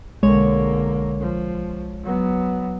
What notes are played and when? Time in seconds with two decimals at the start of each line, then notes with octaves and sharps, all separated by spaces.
0.23 B1 D3 G#3 A#3 C#5
1.21 F3
2.04 F#3 B3